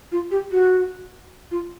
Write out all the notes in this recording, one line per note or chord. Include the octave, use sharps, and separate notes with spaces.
F4
G4
F#4
F4